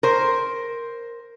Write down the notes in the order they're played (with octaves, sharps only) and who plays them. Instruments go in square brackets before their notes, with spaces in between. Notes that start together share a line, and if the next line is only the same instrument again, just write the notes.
[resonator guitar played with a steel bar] A#4 C5